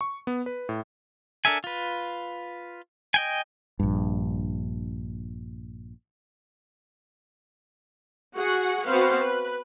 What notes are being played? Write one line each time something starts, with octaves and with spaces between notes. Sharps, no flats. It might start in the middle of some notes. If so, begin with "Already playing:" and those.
C#6
B3
B4
A2
D4 A4 A#4 E5 G#5
F4 B4
D#5 G5 G#5
A#1 G2
F#4 G#4 F#5
B3 C4 F#4 B4 C5 F5
B4